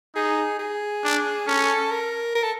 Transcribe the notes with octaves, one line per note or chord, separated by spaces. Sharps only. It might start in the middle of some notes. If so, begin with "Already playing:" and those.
D#4 G#4
G#4
D4
C#4 A4
A#4
A#4
A4